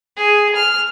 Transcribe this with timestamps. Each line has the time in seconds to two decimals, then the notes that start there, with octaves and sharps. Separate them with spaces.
0.16 G#4
0.56 F6